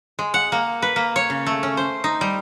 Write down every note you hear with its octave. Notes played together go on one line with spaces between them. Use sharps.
G#3
F#5
A#3
B4
A#3
C#5
C#3
A3
C#4
C5
D#4
G3